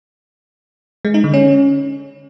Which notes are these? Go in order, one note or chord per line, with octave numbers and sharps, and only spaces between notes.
G#3
D#4
D3
C#4